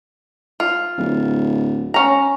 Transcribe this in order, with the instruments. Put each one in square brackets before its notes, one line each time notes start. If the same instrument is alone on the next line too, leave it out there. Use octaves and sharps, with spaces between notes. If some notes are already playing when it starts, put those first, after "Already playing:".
[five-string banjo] F4
[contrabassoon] D1
[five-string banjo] C#4 A#5